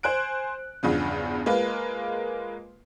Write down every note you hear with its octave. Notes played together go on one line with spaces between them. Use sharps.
C5 G#5 F#6 D7
E2 G2 C#3 F3
G#3 A#3 F4 B4